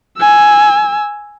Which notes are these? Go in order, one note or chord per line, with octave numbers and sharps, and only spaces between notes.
G#5 E6